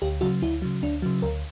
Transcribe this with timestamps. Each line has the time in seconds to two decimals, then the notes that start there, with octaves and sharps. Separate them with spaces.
0.02 D2 G4
0.21 C#3 F#3 F#4
0.42 D2 E4
0.62 C#3 F#3
0.83 D2 D4
1.02 C#3 F#3
1.22 D2 A#4